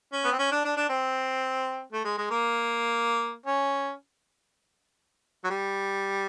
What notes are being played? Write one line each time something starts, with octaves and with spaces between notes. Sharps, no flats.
C#4
B3
C4
C#4
D4
D4
D4
C4
A3
G#3
G#3
A#3
C#4
F#3
G3